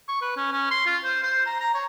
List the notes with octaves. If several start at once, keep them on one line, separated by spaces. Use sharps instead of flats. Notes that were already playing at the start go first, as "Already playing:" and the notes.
C#6
B4
C#4
C#4
C6
F4
C5
C5
A#5
A#5
C#5